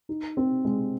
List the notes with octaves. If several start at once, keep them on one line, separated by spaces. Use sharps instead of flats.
D#4
C4
G#3